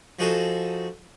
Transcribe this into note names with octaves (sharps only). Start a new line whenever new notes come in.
F3 D#4 F#4 G#4 A4